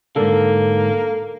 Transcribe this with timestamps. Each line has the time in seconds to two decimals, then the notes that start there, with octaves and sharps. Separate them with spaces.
0.16 G#2 D3 A#3 A4